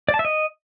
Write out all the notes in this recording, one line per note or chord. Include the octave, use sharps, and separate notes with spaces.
D5
A5
E5
D#5